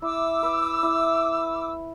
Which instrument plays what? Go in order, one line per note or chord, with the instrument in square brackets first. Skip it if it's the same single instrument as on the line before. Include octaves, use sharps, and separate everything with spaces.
[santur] E4 [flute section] D6 E6
[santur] B4
E4